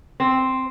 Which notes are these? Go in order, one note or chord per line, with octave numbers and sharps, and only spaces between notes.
C4